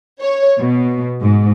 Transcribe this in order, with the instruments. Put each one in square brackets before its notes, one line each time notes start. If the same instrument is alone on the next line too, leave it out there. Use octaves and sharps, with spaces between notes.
[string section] C#5
B2
G#2